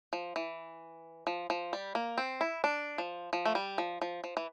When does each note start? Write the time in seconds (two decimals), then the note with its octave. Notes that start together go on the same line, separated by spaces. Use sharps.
0.13 F3
0.36 E3
1.27 F3
1.50 F3
1.73 G3
1.95 A#3
2.18 C4
2.41 E4
2.64 D4
2.98 F3
3.33 F3
3.45 A3
3.55 G3
3.78 F3
4.02 F3
4.24 F3
4.37 E3